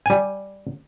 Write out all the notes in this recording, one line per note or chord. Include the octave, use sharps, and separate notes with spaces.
G3 G#5